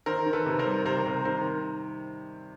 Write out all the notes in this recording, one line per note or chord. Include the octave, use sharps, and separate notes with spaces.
D#3 A#4 C5
D#3
A4 B4
C3
A#4 C5
G3
C3 A#4 C5
C3 A#4 C5
D#3 A#4 C5